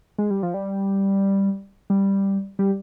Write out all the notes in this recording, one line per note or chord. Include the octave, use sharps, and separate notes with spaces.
G#3
G3
F3
G3
G3
G3